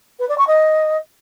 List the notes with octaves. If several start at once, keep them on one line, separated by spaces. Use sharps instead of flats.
B4
D5
C#6
D#5